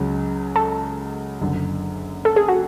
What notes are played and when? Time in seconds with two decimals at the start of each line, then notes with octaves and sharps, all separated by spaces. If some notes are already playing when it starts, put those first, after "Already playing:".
Already playing: C#2 C#3 F#3
0.56 A4
1.41 F#1 F#2 D3
2.25 A4
2.36 G#4
2.48 F#4